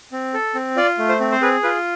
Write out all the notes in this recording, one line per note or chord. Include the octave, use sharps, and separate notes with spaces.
C4
A4
C4
F4 D5
A3
C5
C4
C5
G#4 B4
F4 B4